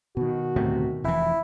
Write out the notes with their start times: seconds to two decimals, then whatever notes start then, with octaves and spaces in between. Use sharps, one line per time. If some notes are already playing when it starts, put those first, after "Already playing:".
0.17 B2 D#3 F#4
0.56 D2 A2 C3
1.04 F1 E3 E4